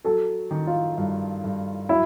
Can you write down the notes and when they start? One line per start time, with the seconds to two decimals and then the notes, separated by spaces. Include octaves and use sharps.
0.05 F#3 A4
0.51 D#3
0.67 F4
0.98 G2
1.44 G2
1.89 F#3 E4